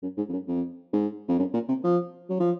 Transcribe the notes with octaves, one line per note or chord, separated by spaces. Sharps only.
F#2
G#2
F2
F#2
F2
G#2
F2
F#2
A#2
C3
F3
F#3
F3